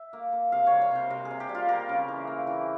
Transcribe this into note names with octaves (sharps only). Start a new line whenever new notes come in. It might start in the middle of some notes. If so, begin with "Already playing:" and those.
Already playing: E5
A#3
A#3
C3 F5
G3 C#5
C#5
C3 C5
C3 A#4
G#4
C3
G4
G3
F4
A#3 A#4
C#3
E3
A#3
E3